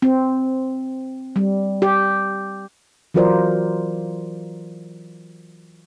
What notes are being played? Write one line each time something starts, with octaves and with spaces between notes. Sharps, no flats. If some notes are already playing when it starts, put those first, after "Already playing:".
C4
G3
G4
E3 F#3 F4 A#4 C5 D5